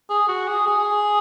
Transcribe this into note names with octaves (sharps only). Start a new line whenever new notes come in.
G#4
F#4
G#4
G#4